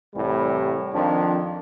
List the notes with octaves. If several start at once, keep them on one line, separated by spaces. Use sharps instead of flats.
C2 A2 E3 G3
F2 D#3 F3 D4